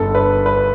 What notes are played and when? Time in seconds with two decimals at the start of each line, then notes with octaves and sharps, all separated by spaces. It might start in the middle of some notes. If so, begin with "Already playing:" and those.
Already playing: G1 G2 D3 A4
0.15 B4
0.46 B4